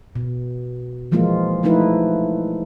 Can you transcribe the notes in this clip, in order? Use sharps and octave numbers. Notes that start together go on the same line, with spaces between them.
B2
E3 F3 G#3 A#3 F4
F3 A3 D#4 E4 B4